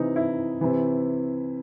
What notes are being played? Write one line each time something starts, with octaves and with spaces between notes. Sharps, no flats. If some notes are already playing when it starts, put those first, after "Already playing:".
Already playing: C3 E3 D#4
E4
C3 E3